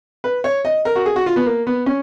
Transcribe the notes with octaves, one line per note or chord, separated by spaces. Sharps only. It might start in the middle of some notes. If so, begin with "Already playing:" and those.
B4
C#5
D#5
A#4
F#4
G#4
F#4
F4
B3
A#3
B3
C#4